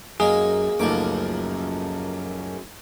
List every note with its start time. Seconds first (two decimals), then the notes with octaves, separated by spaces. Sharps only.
0.20 F#2 G#3 A#3 G#4
0.80 C#2 F#2 F3 A3 A#3 D#4 D6